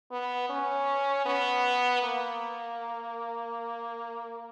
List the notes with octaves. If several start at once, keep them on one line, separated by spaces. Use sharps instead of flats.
B3
C#4
B3
A#3